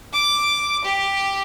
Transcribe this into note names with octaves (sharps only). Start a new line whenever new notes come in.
D6
G4